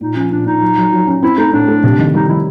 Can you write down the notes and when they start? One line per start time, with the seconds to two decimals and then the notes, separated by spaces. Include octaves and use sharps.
0.01 A#2 D#4
0.16 F3 C#4
0.31 A#2 D4
0.46 A#2 D#4
0.62 F#3
0.78 F#3
0.93 F#3
1.07 C#4
1.23 C4 E4
1.38 A3 D#4
1.53 A2 D4
1.68 A3
1.84 C3
1.99 D#3
2.14 G3 D#4
2.29 D#3 E4